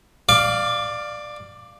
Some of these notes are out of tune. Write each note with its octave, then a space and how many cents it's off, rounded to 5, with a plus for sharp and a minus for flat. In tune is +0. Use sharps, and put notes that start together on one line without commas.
D5 +15 F5 +0 D6 -30